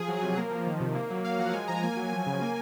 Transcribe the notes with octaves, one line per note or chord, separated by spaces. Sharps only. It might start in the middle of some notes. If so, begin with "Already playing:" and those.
Already playing: F3 G#4
F#3
C3
A#3
F3
D#3
C3
A#3
F#3
A#3 F5
F3 F#5
G#3 G#5
F3 A#5
A#3 G#5
F#3
F3
C#3
A#3